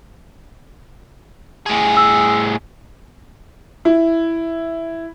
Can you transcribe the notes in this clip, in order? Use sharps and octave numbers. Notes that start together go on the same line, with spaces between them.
A2 G#4
E6
E4